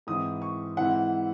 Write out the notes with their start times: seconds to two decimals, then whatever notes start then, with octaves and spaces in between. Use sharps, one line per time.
0.07 G#2 E3 C4 E4 D#6
0.42 C#6
0.77 G#2 E3 C4 E4 F#5